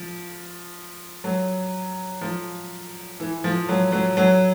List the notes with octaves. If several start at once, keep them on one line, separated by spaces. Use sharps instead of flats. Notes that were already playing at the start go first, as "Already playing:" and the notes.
Already playing: F3
F#3
F3
E3
F3
F#3
F#3
F#3